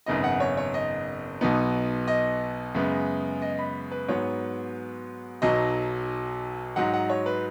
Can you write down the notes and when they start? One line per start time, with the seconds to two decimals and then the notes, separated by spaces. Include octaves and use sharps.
0.06 G#1 F#2 C#3 B3 D#4 D#5
0.24 F#5
0.40 C#5
0.57 C#5
0.74 D#5
1.41 B1 B2 B3 D#4
2.08 D#5
2.74 F#2 C#3 G#3 B3
3.42 D#5
3.59 B5
3.91 B4
4.08 G#2 F#3 B3 C#5
5.42 B1 B2 F#3 D#4 D#5
6.76 G#2 F#3 D#4 F#5
6.94 F#5
7.09 C#5
7.26 B4